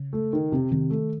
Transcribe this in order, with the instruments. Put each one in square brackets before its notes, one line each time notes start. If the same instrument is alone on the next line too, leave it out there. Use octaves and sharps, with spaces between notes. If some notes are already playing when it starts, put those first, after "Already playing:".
Already playing: [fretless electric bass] C#3
[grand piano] A3
D#3
C3
[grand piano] C3 [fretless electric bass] D#3
[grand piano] A3